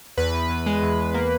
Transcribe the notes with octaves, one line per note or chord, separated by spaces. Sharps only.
E2 B4
E2
E2
G#3
E2
E2
A#3